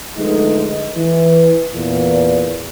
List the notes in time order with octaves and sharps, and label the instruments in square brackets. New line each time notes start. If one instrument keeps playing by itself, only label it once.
[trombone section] D3 F3 G#3 A3 B3 D#4
E3
E2 A#2